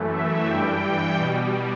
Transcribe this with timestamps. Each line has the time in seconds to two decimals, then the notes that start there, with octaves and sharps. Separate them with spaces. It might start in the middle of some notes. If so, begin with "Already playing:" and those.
Already playing: F#2 E3 A3
0.13 E5
0.48 G2 E3 G3 G5
1.17 B2 G3